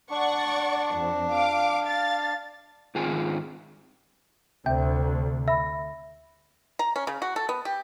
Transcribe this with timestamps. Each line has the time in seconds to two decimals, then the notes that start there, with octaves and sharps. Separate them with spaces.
0.10 D4 D5 F#5 C#6
0.95 F2 C4
1.31 F5 D6
1.86 F5 A6
2.95 G#2 D#3 C4 F4 G#4 G#5
4.66 D2 C3 C5 E5 G5
5.48 E5 B5 A#6
6.79 A#5
6.96 C#4
7.07 C#3
7.22 F#4
7.36 A4
7.49 B3
7.65 G4